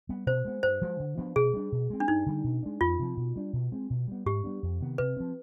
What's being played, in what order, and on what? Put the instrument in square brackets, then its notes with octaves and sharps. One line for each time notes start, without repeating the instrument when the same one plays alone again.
[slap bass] G3 B3
[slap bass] B2 [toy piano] C5
[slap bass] G#3 B3
[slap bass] G2 [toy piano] C5
[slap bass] F3 G#3
D3
F3 B3 D4
[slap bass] B2 [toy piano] G#4
[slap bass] G3 D4
B2
G#3 C4
[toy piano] D4
[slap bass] G2 [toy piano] D#4
[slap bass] D3 G3
B2
G#3 D4
[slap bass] F2 [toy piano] F4
[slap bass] C3 F3
B2
G3 D4
B2
G#3 C4
B2
G3 B3
[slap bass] G#2 [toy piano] G4
[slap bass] G3 B3 D4
F2
C3 D#3 B3
[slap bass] C3 [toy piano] B4
[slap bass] F3 C4